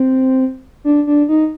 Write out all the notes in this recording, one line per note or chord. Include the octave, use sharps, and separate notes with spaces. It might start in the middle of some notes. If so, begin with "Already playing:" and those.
Already playing: C4
D4
D4
D#4